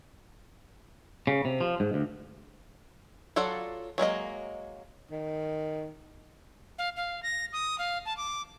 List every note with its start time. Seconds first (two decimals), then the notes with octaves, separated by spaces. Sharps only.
1.27 C#3
1.45 C3
1.61 F3
1.80 G#2
1.94 D2
3.36 F#3 F4 A4 D5 F#5
3.98 F#3 G#3 A#3 D#5
5.11 D#3
6.79 F5
6.96 F5
7.23 A#6
7.53 D#6
7.79 F5
8.06 A5
8.17 D6